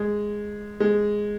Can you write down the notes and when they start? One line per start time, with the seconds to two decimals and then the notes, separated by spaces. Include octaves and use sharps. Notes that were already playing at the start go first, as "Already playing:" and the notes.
Already playing: G#3
0.80 G#3